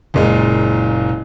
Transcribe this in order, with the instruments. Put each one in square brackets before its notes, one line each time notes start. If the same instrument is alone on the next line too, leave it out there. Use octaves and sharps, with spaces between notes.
[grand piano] F#1 A#2 G#3